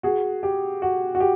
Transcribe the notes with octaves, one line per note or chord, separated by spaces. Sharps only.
F#4 G#4
G4
F#4
F#4
G4